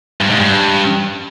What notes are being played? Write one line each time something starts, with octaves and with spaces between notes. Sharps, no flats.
G2
G#2
G2